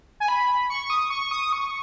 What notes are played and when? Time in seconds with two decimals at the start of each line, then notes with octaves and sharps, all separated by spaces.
0.20 G#5
0.28 B5
0.70 C#6
0.90 D#6
1.10 C#6
1.31 D#6
1.52 C#6